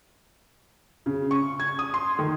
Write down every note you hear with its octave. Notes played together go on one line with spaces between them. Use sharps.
C#3
C#6
G#6
D#6
C6
D#3